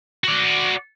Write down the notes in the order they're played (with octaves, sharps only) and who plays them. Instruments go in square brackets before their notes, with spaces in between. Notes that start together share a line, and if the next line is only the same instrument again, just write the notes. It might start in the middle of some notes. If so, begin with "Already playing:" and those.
[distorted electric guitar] F#4 D5